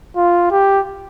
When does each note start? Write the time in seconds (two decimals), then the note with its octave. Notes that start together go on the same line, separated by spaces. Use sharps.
0.17 F4
0.51 G4